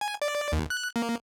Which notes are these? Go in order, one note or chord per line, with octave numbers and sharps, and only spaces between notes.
G#5
D5
D#2
F#6
A#3